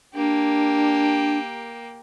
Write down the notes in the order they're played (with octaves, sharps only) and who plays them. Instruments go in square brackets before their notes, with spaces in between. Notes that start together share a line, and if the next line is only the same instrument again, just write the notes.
[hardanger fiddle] A#3 G4 [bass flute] D4